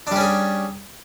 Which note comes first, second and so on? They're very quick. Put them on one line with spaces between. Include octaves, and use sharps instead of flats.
D4 G3 C#4 G#4